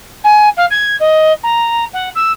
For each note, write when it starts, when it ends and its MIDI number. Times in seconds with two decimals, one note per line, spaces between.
0.24 0.49 80
0.57 0.65 77
0.70 0.96 92
1.00 1.32 75
1.43 1.85 82
1.93 2.09 78
2.15 2.32 88